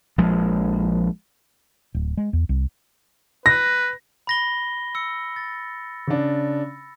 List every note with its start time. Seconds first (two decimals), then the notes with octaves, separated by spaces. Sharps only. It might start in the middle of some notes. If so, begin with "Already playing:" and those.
0.18 A#1 F3 G#3
1.94 D1
2.17 G#3
2.33 E2
2.49 C2
3.46 B4 A#6
4.27 B5 A#6 G7
4.95 E6 C#7
5.36 A6
6.07 C#3 D4